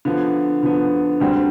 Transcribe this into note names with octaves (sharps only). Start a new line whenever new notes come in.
D3 F3 B3
D3 F3 B3
D2 D3 G3 C4